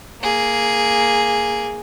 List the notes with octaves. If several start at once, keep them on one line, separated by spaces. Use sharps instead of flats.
A#3 G#4